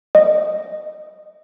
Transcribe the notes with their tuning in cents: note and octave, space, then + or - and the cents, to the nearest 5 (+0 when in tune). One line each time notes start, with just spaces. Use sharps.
D#5 -15